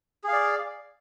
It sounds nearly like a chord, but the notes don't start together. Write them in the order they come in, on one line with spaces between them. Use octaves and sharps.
G#4 F5 D5